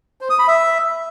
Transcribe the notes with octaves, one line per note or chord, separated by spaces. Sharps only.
C5
D#6
B5
E5